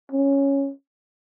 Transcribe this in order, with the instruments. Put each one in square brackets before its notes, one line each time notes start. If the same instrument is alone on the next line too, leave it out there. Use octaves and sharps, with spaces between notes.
[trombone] C#4